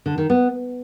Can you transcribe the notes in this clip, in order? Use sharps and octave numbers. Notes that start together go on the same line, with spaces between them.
D3
D#3
B3